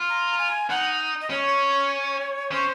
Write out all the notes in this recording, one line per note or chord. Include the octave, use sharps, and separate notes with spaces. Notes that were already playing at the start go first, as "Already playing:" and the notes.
Already playing: F4
A#5
G#5
D#4 F#5
D#5
C#4 C#5
C#4 C5